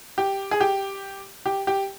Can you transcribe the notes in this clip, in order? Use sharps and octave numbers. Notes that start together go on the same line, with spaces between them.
G4
G#4
G4
G4
G4